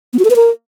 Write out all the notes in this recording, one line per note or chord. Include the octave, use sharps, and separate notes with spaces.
B3
F#4
A4
B4
A#4